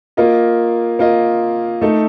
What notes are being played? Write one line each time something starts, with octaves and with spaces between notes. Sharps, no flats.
A#3 F4 A#4 D#5
A#3 F4 A#4 D#5
A3 D#4 A4